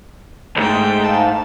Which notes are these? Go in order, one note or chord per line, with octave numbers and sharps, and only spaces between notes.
C2 G#2 A3 G5
F5 A5